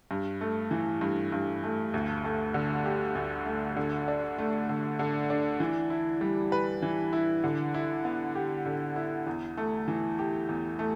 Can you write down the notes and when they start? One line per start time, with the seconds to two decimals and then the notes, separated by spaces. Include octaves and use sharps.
0.11 G2
0.41 A3
0.71 E3
1.01 G2
1.32 G2
1.63 A3
1.94 D2
2.24 A3
2.54 D3
2.85 G4
3.15 D2
3.46 A3
3.76 D3
4.08 D4
4.38 A3
4.69 D3
4.99 D3
5.30 D4
5.60 E3
5.90 E4
6.21 G3
6.52 B4
6.82 E3
7.13 E4
7.44 D3
7.74 E4
8.05 B3
8.35 G4
8.66 D3
8.96 E4
9.27 E2
9.57 A3
9.88 E3
10.19 G4
10.49 E2
10.79 A3